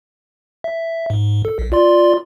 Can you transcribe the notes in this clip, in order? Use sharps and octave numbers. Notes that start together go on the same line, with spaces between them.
E5
G#2
A4
B1
F4 D5 C6